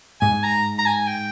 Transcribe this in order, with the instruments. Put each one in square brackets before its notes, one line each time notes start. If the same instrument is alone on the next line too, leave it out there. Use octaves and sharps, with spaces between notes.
[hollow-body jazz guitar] G#2 [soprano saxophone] G#5
[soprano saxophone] A#5
A#5
G#5
G5